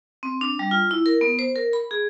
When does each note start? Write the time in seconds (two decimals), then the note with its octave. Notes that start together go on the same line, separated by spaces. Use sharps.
0.23 C4
0.41 D4
0.59 G3
0.71 F4
0.91 E4
1.06 A#4
1.21 B3
1.39 C5
1.56 A#4
1.73 B5
1.91 G#4